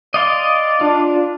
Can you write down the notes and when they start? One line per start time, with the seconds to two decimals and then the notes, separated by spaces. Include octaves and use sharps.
0.14 D5 D#5 F5 C6
0.81 D4 F4